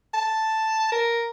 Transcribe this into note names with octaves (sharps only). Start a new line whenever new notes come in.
A5
A#4